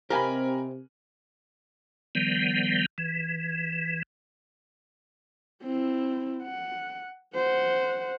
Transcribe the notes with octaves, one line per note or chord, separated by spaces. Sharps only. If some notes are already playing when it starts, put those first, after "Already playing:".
C3 C4 G4 A#4 D#5 F5 G#5 B5
D#3 F3 G3 B3
E3
C4 E4
F#5
C5 F#5